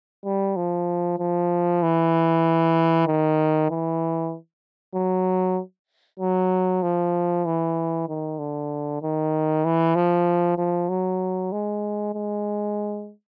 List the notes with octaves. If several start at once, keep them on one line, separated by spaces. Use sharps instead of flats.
G3
F3
F3
E3
D#3
E3
F#3
F#3
F3
E3
D#3
D3
D#3
E3
F3
F3
F#3
G#3
G#3